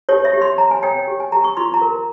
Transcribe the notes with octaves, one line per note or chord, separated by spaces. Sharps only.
G4 C#5
E5
G4
C6
C#5 A#5
G#5
C#5 G5
G4
G#5
G4 A#5
C#6
F4 C6
A#5
A#4